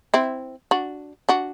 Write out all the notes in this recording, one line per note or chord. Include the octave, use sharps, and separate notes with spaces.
C4 E4
D4 F#4
D4 F#4